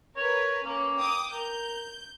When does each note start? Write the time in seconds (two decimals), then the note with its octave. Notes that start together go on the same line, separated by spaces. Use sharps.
0.17 A#4 B4 C#5
0.66 A#3 C#4
1.00 G5 D6 D#6
1.32 A#4 G6